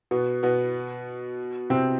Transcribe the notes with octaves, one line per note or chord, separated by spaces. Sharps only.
B2 B3
B2 B3
C3 C4